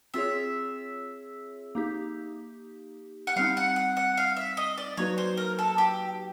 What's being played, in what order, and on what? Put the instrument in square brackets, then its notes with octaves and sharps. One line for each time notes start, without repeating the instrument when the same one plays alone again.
[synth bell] C4 F4 G#4 C#5 [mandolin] E5
[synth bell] A#3 D#4 G4
[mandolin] F#5
[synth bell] G3 C4 D#4 [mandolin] F5
[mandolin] F#5
F#5
F#5
F5
E5
D#5
D5
[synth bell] F#3 A#3 D#4 F#4 B4 [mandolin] C#5
[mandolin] C5
A#4
A4
G4